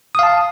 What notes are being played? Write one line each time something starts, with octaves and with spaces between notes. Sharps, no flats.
F5 A5 D#6